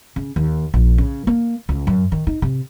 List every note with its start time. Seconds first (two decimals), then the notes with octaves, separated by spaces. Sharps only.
0.16 C#3
0.36 D#2
0.74 A#1
0.98 C#3
1.27 A#3
1.69 C#2
1.87 F#2
2.12 D#3
2.27 D#4
2.42 C3